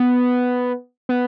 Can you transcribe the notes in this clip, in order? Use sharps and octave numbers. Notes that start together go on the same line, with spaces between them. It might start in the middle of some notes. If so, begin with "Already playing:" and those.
Already playing: B3
B3